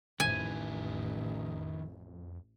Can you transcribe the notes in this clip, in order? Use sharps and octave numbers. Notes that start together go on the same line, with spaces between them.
A1 F2 D#3 E4 G#5